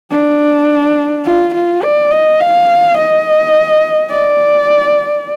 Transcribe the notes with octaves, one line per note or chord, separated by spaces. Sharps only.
D4
F4
F4
D5
D#5
F5
D#5
D5